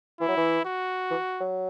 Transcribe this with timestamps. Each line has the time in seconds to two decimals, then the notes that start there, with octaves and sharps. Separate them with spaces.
0.20 E3 E4
0.28 F#3
0.37 E3
0.65 F#4
1.10 E3
1.40 F#3